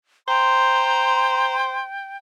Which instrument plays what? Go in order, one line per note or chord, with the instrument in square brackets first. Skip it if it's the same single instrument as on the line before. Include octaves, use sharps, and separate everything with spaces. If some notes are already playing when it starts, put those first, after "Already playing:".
[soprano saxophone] C5 [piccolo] G5 [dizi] A#5 [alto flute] C6